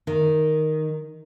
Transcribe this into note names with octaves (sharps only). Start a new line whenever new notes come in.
D#3